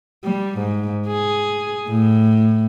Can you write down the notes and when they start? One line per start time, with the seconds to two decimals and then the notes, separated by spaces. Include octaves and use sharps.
0.24 G3
0.58 G#2
1.08 G#4
1.89 A2